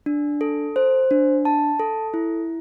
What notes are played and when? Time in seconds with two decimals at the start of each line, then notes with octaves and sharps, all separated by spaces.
0.06 D4
0.41 A4
0.76 C5
1.11 D4
1.45 A5
1.79 A4
2.14 E4